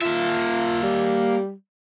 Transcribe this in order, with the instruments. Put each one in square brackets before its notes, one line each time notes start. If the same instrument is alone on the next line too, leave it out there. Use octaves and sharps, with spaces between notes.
[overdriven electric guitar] A#3 E5 [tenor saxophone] F4
[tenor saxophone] G3